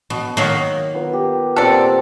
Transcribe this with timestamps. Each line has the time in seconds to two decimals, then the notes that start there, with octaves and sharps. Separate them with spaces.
0.10 B2
0.37 D#3 F#3 A#3
0.94 B3 F4 A#4
1.13 G4
1.56 A#2 C4 A4 D5 F#5